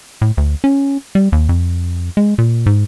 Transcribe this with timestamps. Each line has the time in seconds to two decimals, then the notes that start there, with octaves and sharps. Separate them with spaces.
0.22 A2
0.37 D2
0.64 C#4
1.15 G3
1.32 D#2
1.49 F2
2.17 G#3
2.38 A#2
2.66 G#2